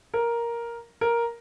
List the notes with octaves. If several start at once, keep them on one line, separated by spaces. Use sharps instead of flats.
A#4
A#4